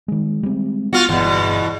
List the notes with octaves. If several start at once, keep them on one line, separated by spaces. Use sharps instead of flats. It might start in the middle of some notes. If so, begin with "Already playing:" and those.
D#3 G#3
G3 G#3 C4
B3 F4 F#4
G1 E2 B2